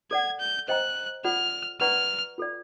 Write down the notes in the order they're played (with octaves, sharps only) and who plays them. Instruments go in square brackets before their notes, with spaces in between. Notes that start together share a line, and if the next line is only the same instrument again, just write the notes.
[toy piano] A4 D5 F#5 [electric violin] G#6
[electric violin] G6
[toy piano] C5 D#5 G5 A#5 [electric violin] F#6
[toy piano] F4 A4 D5 F#5 [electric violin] F6
[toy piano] B4 D5 F#5 A#5 C#6 [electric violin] F6
[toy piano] F4 A4 D5